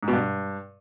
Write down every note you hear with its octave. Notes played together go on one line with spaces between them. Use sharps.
G#2
B2
G2